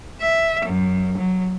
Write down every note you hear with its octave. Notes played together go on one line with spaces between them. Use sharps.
E5
F#2
F#3